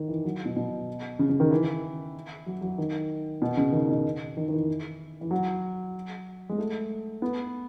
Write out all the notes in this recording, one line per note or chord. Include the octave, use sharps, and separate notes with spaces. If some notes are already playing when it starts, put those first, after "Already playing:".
Already playing: D#3
E3
F#3
B2
B2
C#3
C#3
D#3
E3
F#3
F#3
D#3
B2
C#3
D#3
B2
D#3
D#3
E3
E3
F#3
G#3
A3
B3